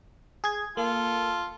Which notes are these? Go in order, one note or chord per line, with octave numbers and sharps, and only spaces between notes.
G#4 G#6
A#3 F4 A4